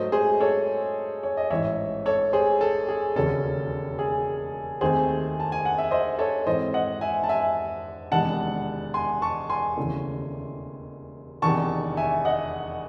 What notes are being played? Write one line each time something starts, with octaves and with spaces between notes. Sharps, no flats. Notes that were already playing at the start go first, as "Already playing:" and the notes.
Already playing: G#2 F#3 A3 C5 D#5
G#4 C5
A4 C#5
C#5
D#5
A1 G#2 E3 C#5 E5
A4 C#5
G#4 C5
A4
G#4
E1 D#2 C#3 F#3 C#4 A4
G#4
D#2 D#3 A3 C4 G#4 C5
A5
G#5
F#5
E5
C5 D#5
A4 C#5
G#2 E3 C4 C5 D#5
D#5 F#5
E5 G#5
A5
E5 G#5
E1 E2 C3 D#3 G#3 F#5 A5
G#5 C6
A5 C#6
G#5 C6
E1 D#2 C#3 E3 A3
E1 E2 C3 D#3 A5 C#6
E5 G#5
D#5 F#5